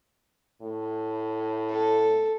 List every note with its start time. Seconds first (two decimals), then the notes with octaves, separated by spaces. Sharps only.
0.62 A2
1.71 A4